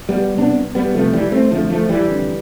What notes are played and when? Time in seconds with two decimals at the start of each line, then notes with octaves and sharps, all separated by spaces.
0.09 G3 B3
0.37 C2 C3 B3 D4
0.75 G3 B3
0.94 C2 C3 F3 A3
1.13 E3 G3
1.32 A3 C4
1.50 F2 D3 F3 A3
1.70 F3 A3
1.89 E3 G3
2.08 F2 D3